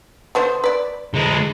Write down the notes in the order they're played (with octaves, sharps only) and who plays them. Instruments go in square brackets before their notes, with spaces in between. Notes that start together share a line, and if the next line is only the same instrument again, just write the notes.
[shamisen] D3 B3 C5
B4 D5
[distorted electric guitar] D3 G#3